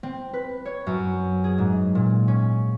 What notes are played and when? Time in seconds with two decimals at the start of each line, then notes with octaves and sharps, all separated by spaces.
0.03 C4
0.33 B4
0.65 C#5
0.87 F#2
1.44 G#4
1.58 G#2
1.95 A#2
2.28 C#4